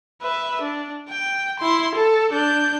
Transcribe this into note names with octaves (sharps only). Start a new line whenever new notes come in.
B4 E5
D4
G5
E4 C6
A4
D4 G6